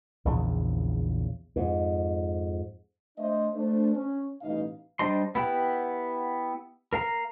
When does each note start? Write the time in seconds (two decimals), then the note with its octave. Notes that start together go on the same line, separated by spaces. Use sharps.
0.25 A#1 E2 C#3
1.56 F2 G#2
3.17 A3 D4 C5 D#5 E5
3.55 A3 D4 C5
3.94 C#4
4.42 A1 B2 G3 D#4 D#5 F5
4.99 G3 D4 C5 D#5 C6
5.35 B3 E4 G4 F#5
6.93 A#4 F5 A#5